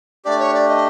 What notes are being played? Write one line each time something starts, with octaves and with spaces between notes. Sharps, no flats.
A3 D4 G4 D5
C#5
D5
D#5